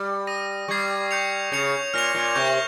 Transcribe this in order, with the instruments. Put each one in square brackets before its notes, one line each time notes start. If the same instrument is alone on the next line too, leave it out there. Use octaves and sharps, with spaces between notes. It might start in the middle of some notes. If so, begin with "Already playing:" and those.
Already playing: [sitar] G3
[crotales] D#6 A#6 D#7
[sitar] G3 [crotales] C#6 G#6 C7
[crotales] C#6 G6 C#7 F7
[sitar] C#3 [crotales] G6 C#7 F7
[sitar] A#2 [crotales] F6 A#6 F7
[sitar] A#2
[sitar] C3 [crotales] C#6 G6 A#6